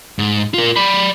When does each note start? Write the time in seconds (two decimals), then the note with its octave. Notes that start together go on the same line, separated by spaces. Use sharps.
0.19 G#2
0.54 F4 A#4
0.76 D5 B5